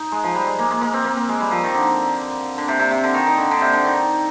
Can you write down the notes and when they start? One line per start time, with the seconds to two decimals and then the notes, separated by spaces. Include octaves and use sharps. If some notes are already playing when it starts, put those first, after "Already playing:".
Already playing: D#4
0.12 G#3
0.24 F3
0.35 G3
0.47 G#3
0.58 A#3
0.71 G#3
0.81 A#3
0.93 C4
1.05 A#3
1.17 C4
1.29 G#3
1.41 G3
1.51 F3
1.64 D#3
1.75 D3
2.58 D3
2.68 C3
2.79 C3
2.91 C3
3.04 D3
3.14 D#3
3.27 D#3
3.38 D3
3.51 D3
3.61 C3
3.73 D3
3.85 D#3